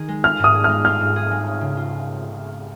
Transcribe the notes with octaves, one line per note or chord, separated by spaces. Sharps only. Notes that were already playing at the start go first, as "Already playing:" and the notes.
Already playing: D#3 G#4
G#3
F4 F6
G#2 D#6
G#4
G#3 F6
F4 F6
G#2
G#4
G#3
C#4
C#3
F4